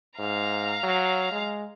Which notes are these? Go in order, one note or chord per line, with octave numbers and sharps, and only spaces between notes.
G#2 F5 A#5
F#3
G#3